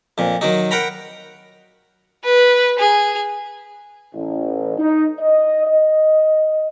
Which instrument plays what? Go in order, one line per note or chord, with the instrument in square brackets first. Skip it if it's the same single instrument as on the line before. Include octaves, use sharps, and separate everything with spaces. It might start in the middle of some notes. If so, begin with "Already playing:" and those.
[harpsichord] F2 A#2
D#3 F#3 D#4
A#4 F#5 G5 A#5 B5
[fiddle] B4
G#4
[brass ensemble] A1
D#4
D#5
D#5